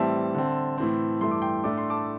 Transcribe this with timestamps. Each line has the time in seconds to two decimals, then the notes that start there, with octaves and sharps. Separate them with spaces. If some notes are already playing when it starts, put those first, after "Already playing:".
Already playing: A2 E3 G3 C4 E5 A5
0.34 D3 C4
0.78 A2 E3 C4
1.21 G2 E3 A3 C6
1.31 D6
1.42 G5 C6
1.64 A2 A3 D4 D6
1.78 C6
1.90 A5 D6